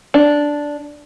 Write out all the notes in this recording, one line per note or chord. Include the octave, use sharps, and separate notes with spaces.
D4